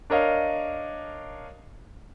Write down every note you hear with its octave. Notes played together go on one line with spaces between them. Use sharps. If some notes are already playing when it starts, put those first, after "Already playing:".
D4 A#4 C#5 D#5 F5